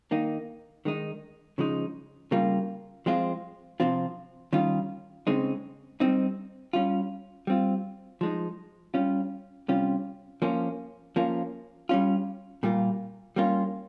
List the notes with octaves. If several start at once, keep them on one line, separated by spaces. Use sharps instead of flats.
D#3 A#3 D#4
D#3 G#3 D#4
C#3 F3 G#3 D#4
C#3 G3 A#3 F4
F3 G#3 C4 F4
C3 F3 C4 F4
D#3 G3 C#4 F4
C#3 G#3 C4 D#4
G3 C4 D#4
G3 C#4 F4
G3 C4 F4
F3 G#3 D#4
G3 C#4 F4
C3 G3 C#4 F4
F3 A#3 C#4 F4
F3 A#3 C#4 F4
G3 C#4 F4
A#2 G3 A#3 F4
G3 A#3 C#4 F4